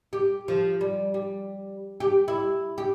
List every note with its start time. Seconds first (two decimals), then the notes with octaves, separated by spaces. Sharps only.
0.13 G4
0.48 F3
0.81 G3
1.14 G3
2.00 G4
2.28 E4
2.78 G4